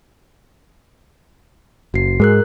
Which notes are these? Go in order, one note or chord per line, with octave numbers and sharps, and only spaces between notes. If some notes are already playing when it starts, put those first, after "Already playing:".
F#1 F#4 C7
G#2 G#3 G#4 A#4 F#6